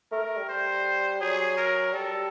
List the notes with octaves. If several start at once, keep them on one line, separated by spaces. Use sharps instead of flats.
A3 A#4
A3
G3
C5
F#3 G#4
A#4
G3 A4